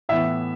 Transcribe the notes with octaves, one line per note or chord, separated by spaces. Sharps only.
A2 E3 B3 E5